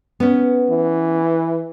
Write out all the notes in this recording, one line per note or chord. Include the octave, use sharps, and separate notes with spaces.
B3 C#4
E3